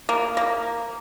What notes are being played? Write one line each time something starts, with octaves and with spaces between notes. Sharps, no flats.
A#3
A#3